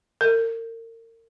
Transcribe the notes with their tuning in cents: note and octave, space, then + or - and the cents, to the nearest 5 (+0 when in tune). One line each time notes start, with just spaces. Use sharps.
A#4 -35